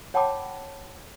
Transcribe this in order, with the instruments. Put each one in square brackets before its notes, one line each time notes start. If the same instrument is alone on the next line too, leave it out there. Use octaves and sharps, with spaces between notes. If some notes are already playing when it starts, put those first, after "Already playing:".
[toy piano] C#5 F#5 G5 A5 B5 D6